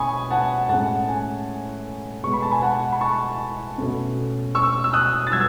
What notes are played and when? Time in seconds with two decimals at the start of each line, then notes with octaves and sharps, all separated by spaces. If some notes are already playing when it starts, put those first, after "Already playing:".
Already playing: B2 C#4 G#5 B5 C#6 D#6
0.31 F#5 A5
0.69 A2 G#3 C#4 F#5 A5
1.08 G#5
2.23 B2 G#3 B3 C#6
2.33 B5
2.42 A5
2.51 G#5 B5
2.62 F#5 A5
2.92 B5
3.01 A5 C#6
3.78 B2 A3 C#4
4.55 C#6 E6
4.84 E6
4.93 D#6 F#6
5.27 A6
5.32 B2 F#3 B3 E6 G#6